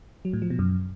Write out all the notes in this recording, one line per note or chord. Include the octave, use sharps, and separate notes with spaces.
F#3
A2
F3
B2
F#2